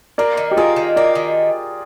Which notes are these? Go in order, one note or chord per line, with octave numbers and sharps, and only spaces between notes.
A#3 A#4 D5
D#3
G4
A#3 F4 G#4
D#3
A#3 A#4 D5
D#3